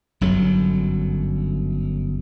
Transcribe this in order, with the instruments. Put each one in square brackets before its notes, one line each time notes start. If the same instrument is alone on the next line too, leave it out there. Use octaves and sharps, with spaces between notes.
[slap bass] G1 F#2 D3 F#3